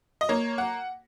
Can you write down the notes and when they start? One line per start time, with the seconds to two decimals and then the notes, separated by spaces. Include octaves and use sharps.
0.21 D#5
0.29 A#3 C#5
0.58 F#5